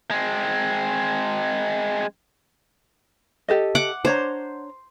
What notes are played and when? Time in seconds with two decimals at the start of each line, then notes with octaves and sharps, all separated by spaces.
0.11 G#3 C4
3.48 G4 A4 D#5
3.75 F#5 D6
4.05 D4 C5 C#5 A#5